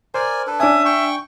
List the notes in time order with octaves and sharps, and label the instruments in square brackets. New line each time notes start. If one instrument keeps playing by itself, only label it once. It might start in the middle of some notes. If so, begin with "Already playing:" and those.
[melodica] A#4 D5 G#5 [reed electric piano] C5
[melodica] D4 A4 B4
[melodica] C#4 D#6 [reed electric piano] D4 G#5 [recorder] E5
[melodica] G5 C#6